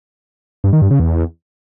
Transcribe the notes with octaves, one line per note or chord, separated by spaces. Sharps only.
G2
D#3
G2
C#3
E2